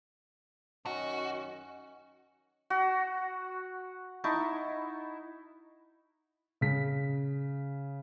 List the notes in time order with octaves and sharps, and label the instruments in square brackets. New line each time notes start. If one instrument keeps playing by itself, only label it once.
[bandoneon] F#2 D#3 C#4 [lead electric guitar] F#4 [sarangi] D#5
[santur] F#4
D#4 E4 A5 C#6
[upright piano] C#3 G#4 B6